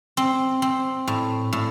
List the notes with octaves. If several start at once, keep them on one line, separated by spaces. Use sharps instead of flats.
C4
C4
A2
A2